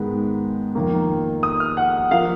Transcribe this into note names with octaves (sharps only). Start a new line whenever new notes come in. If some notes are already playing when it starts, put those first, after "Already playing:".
Already playing: G#2 D#3 G#3 B3
F2 D#3 A#3
D#6
F6
F#5
F3 A#3 F5